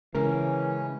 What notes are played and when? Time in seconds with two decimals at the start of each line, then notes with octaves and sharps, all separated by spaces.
0.15 C#3 E3 G#3 C#4 A#4